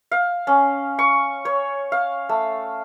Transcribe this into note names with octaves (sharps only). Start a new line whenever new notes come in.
F5
C#4
C#6
C#5
F5
A3